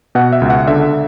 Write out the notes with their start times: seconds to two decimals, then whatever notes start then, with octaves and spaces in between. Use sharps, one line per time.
0.15 B2 F#5
0.32 E5
0.42 C#2
0.50 F#5
0.67 D3 E5